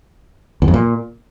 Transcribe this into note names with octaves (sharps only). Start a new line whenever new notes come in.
E2
F2
A#2